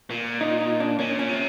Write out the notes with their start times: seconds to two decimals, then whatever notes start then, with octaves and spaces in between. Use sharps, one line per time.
0.11 A#2
0.41 D#4
0.61 D#4
0.80 D4
0.99 A#2 C#4
1.19 C#4
1.29 C3